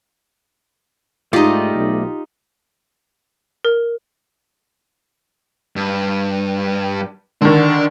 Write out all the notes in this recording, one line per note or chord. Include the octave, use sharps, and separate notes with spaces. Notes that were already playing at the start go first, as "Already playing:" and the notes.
G#2 A3 D#4 F4 G4 D5 D#5
B1
A#4
G2
D3 D#3 D4